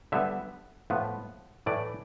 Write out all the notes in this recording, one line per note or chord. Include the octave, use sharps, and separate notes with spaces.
D3 G3 B3 E5
A2 F3 B3
A2 E3 A3 D5